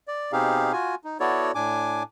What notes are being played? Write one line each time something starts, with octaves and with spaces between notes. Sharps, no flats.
D5
B2 C4 D#4 G4 G#4 F5
F4 F#4 G#5
D#4
B3 E4 F#4 A4 C#5 D5
A2 D4 G#5 D6